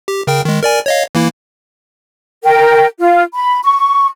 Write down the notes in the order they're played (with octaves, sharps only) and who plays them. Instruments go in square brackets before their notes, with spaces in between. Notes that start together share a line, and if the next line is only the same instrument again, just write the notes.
[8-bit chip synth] G4
C#3 A#4 G5
D#3 G#3
A#4 D5 G#5
C#5 D#5 F5
E3 A#3 E4
[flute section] A#4 G5
F4 F5
B5
C#6